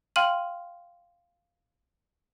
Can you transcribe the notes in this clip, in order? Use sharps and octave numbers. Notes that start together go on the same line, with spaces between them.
F5 G5 C6 F6 D#7 F#7